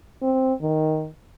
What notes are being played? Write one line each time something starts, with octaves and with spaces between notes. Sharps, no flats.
C4
D#3